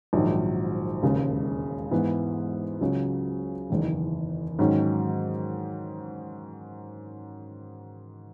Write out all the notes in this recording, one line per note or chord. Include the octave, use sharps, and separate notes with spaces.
A#1 G#2 D#3 F#3
E1 D#2 C#3 G#3
G#2 E3 B3
C#2 C#3 F#3
F#1 E2 D#3
G#2 D#3 F#3 C#4